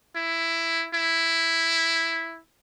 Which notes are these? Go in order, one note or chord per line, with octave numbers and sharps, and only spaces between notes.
E4
E4